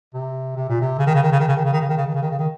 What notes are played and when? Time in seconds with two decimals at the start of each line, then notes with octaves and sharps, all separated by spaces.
0.14 C3
0.56 C3
0.69 A#2
0.81 C3
0.98 C#3
1.07 D#3
1.14 C#3
1.23 D#3
1.32 C#3
1.40 D#3
1.48 C#3
1.57 D#3
1.65 C#3
1.73 D#3
1.81 C#3
1.89 D#3
1.97 C#3
2.06 D#3
2.14 C#3
2.22 D#3
2.31 C#3
2.39 D#3